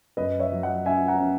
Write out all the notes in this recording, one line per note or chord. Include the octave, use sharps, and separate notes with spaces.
F#2 B4 D#5
C#5 E5
F#3
D#5 F#5
C#4 E5 G#5
F#5 A#5
C#4